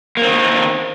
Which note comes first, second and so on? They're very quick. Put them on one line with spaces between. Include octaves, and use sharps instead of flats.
A#3 C4 D#3